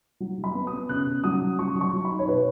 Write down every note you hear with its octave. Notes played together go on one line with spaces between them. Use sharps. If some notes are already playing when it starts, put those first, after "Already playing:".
F#3
F#3
B5
B3
D#6
B3
C#3 F#6
C#3
F#3 D#6
C#3
F#3 C#6
F#3
C#6
F#3
B5
D#4
C#5
B2 B4